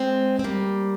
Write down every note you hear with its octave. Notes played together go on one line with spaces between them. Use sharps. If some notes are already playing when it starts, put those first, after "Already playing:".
Already playing: G#3 C4
C4
G3 A#3